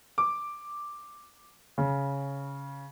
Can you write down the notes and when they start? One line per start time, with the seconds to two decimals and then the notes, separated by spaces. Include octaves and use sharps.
0.18 D6
1.78 C#3